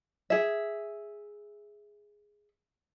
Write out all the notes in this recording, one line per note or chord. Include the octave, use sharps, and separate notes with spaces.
G#4 E5